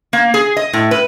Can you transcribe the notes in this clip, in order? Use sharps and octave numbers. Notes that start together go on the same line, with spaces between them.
A#3
G#4
D#5
A2
B4